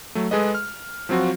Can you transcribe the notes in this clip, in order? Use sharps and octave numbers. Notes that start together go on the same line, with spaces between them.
F#3 A3
G#3 G#4 A4 B4 D#5
F6
F3 F#3 C4 F4 F#4